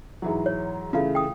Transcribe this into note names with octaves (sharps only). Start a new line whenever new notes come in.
G#2 E3 F#3
C#5
C#3 E3 A3 F4 F5
G5 D#6